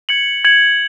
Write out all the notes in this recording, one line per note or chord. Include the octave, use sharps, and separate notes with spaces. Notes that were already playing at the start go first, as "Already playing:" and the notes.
G#6 C#7 F#7
G#6 C#7 F#7